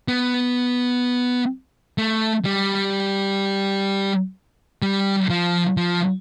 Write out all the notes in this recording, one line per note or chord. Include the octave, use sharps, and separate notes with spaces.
B3
A3
G3
G3
F3
F3